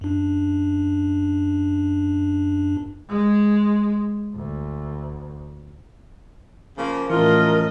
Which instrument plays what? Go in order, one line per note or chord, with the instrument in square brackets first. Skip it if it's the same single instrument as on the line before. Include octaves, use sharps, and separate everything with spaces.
[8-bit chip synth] F#2 D4
[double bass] G#3
D2
[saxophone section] C#3 F3 A#3
[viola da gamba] A2 D#5 [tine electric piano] E3 C#4 E4 [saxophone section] F3 F4 [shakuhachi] A#4